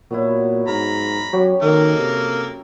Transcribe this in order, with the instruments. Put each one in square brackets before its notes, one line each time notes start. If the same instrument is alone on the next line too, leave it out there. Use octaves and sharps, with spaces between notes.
[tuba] A#2 [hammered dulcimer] F#3 B3 E4
[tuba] G#2 [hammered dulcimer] A#4 [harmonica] A#5 B5
[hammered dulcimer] F#2 G4 C#5 [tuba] F#3
[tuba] D#3 [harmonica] A#3 A4 A#4
[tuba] C3